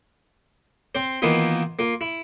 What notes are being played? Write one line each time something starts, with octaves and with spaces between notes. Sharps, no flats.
C4 C5
D#3 E3 A#3 B3 D#4 F4
A#3 F4
E4